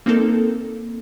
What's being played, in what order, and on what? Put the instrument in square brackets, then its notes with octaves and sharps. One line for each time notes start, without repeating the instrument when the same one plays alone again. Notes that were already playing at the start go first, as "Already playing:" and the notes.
[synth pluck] A#3 C4 D#4 A4 A#4